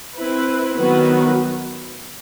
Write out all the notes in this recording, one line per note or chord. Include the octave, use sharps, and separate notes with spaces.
C4 E4 B4
D#3 F#3 B3 F#4 B4